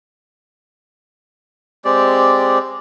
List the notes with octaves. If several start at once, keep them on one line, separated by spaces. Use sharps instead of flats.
G#3 C4 G4 D5